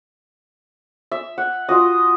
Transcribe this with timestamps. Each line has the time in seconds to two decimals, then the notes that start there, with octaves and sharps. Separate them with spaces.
1.12 E5
1.38 F#5
1.69 F4 F#4 D#5